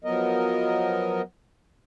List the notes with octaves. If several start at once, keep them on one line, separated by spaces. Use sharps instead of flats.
F3 F#3 B3 A#4 D#5